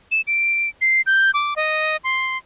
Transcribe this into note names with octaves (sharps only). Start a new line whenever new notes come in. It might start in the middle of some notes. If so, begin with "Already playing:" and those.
E7
D7
C7
G6
D6
D#5
C6